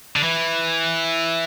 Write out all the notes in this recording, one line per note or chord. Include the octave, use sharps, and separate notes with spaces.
D3
E3